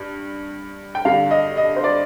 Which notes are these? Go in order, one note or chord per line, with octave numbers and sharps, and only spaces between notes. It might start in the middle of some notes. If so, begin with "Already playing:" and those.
Already playing: G2
G5
G2 D3 F5
D#5
D#5
C5
D5